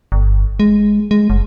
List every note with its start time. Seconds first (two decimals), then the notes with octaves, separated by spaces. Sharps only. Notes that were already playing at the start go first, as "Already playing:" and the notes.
0.12 G1
0.60 G#3
1.11 G#3
1.30 F#1